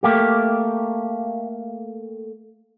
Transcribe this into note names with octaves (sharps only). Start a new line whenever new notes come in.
A3 A#3 G4